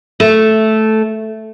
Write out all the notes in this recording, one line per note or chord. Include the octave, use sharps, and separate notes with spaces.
A3